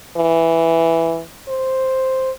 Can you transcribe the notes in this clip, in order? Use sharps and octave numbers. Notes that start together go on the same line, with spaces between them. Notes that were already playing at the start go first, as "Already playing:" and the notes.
E3
C5